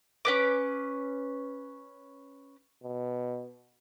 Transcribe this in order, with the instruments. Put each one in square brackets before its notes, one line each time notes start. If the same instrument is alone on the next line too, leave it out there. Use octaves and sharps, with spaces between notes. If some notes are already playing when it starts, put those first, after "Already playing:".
[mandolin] C#4 B4 D6
[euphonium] B2